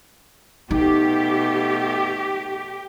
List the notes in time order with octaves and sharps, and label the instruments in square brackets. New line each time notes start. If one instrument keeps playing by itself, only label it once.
[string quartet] B2 A3 [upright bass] D#4 [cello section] G4